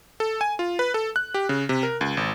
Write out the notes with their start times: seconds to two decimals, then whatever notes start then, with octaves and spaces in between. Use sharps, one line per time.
0.20 A4
0.41 G#5
0.59 F4
0.79 B4
0.94 A4
1.16 F#6
1.34 G4
1.49 C#3
1.69 C3
1.83 A#4
2.01 C#2
2.17 G#1